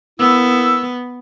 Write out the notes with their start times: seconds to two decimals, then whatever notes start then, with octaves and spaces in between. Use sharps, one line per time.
0.19 A#3 B3 E4 E6